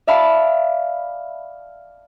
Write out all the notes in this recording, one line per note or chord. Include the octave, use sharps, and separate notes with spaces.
D5 E5 F5 A5 B5